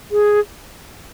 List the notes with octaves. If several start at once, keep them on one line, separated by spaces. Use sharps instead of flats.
G#4